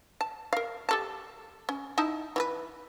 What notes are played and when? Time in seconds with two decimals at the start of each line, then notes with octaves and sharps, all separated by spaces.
0.21 A5
0.53 A#4 F5
0.89 G4 A4 A5
1.69 C#4
1.98 D#4 E4 A5
2.36 E3 G4 B4